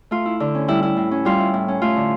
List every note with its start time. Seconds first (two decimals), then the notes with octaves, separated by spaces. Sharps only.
0.11 A3 F4
0.26 E4
0.40 D3
0.55 C#4
0.68 G3 E4
0.83 E4
0.97 A2
1.11 C#4
1.25 G3 F4
1.39 E4
1.54 A2
1.68 C#4
1.82 A3 F4
1.96 D3